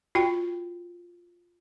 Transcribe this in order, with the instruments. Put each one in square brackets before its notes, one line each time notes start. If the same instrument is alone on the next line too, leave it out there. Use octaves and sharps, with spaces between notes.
[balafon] F4 F#4 G5